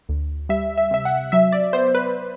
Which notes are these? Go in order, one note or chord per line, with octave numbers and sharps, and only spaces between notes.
D2
G3 E5
E5
C3 E5
F#5
F#3 E5
D5
B3 C5
B4